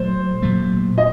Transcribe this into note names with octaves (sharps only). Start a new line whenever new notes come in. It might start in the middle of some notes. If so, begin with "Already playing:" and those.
Already playing: A#2 F#3 A3 C5
A#2 F#3 A3
D#5